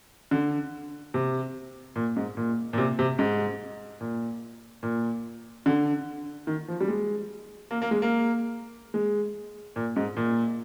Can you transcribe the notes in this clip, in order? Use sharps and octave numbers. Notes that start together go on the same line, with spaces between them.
D3
C3
A#2
G#2
A#2
A#2
C3
C3
G#2
A#2
A#2
D3
D#3
F3
G3
G#3
A#3
A#3
G#3
A#3
G#3
A#2
G#2
A#2